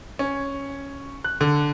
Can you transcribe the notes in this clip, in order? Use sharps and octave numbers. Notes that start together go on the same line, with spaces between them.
C#4
F#6
D3